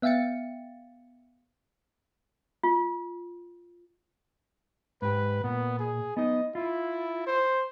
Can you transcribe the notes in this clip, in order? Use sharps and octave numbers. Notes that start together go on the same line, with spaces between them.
B3 E5 F5 G5 A6 C#7
F4
G#2 G4 B4
A#2 B3
G#4
B3 D#4 D#5
E4 F4
C5